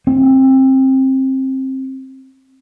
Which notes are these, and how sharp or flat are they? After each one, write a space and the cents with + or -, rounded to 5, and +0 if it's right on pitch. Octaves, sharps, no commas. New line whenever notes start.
C4 +20